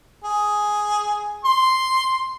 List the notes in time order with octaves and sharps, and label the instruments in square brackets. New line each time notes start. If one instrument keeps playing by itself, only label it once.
[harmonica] G#4
C6